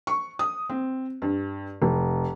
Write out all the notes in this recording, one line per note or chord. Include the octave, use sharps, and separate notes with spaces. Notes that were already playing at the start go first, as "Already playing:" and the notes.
C#6
D#6
C4
G2
F1